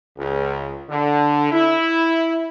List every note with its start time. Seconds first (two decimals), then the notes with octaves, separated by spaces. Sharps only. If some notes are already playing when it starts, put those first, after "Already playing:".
0.18 C#2
0.90 D3
1.52 E4